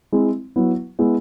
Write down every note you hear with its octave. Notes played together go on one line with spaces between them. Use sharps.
G#3 C4 E4
F#3 B3 E4
G#3 B3 E4